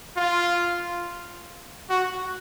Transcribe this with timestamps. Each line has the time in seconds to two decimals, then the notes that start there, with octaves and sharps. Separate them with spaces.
0.17 F4
1.90 F#4